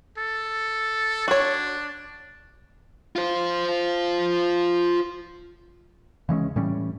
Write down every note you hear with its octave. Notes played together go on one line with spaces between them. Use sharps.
A4
D4 F#4 C#5
F4 C5
C#3 E3 G#3 C#4
A2 E3 G3 C#4